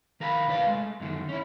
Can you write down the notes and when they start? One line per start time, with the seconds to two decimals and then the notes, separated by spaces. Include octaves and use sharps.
0.20 D#3 A#4 F5 G#5 B5
0.47 C2 G2 D4 B4 D5 F5
0.67 G#3 A3
1.00 F#2 D3 D#3
1.29 C#4 E4